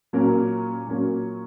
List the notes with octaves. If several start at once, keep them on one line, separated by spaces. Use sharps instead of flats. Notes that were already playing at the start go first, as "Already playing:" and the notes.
A#2 F#3 C#4 A#4
A#2 F#3 C#4 A#4